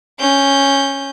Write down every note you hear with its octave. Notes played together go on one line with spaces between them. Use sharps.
C#4 G6